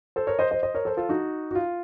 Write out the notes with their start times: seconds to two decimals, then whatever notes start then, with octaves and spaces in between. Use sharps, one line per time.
0.16 A4 C5
0.27 A#4 C#5
0.39 C5 D#5
0.51 C5 D#5
0.63 C5 D#5
0.74 A#4 C#5
0.85 A4 C5
0.97 F4 A4
1.09 D#4 F#4
1.51 F#4
1.55 F4